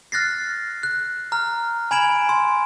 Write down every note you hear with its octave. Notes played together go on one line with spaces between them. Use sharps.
F6 F#6 A6 A#6 C7
F#6
A#5 F6
G#5 B5 G#6 D7 E7 F#7
C6